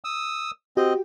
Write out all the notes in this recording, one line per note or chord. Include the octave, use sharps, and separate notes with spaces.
D#6 E6
C4 F#4 G4 D#5 G5